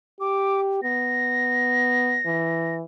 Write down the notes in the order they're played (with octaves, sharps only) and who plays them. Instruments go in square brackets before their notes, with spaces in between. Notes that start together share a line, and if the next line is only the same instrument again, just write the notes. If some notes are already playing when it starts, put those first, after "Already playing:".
[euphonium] G4 [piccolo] D6
[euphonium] B3 [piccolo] A#6
[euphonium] E3